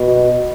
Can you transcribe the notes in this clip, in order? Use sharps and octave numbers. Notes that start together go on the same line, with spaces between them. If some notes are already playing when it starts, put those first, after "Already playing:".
Already playing: B2